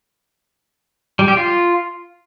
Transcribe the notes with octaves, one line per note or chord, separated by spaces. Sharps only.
G3
G4
F4